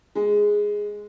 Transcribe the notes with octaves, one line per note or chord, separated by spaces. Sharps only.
G#3